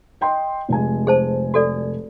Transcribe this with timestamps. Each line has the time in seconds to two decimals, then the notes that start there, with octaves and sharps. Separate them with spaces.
0.21 D#5 G5 C6
0.69 F1 G#3 G#5
1.07 G#4 C5 A5
1.54 F#4 A4 D5